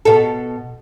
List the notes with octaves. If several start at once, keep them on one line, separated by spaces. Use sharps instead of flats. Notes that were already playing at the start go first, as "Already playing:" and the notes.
B2 A4